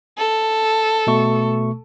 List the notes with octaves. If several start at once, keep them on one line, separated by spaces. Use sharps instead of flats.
A4
B2 A3 C#6